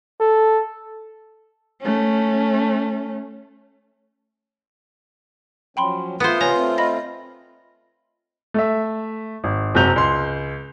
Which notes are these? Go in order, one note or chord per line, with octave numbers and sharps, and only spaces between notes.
A4
A3 C#4
F3 F#3 C#4 G5 B5 C6
A3 B3 F4 C5
C3 B4 C#5 G#5 A#5
A3 C4
D#5 B5 A#6
A3 E5
G#1
F#1 C3 F#3 G6 F7
C#2 C6